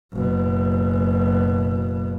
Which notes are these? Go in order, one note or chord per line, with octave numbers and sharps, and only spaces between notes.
F#1 B2